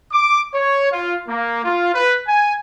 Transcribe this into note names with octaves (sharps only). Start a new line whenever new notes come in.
D6
C#5
F4
A#3
F4
B4
G#5